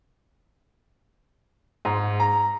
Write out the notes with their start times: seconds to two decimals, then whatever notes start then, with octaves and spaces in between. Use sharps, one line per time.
1.85 G#2
2.20 A#5